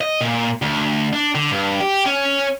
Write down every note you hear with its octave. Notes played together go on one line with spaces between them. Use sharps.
D#5
A#2
D2
D4
D3
G2
G4
C#4